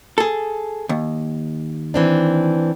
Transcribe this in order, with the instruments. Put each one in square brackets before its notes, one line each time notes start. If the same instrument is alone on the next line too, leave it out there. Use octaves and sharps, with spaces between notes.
[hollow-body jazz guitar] G#4 A4
D#2
[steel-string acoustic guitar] E3 C4 D4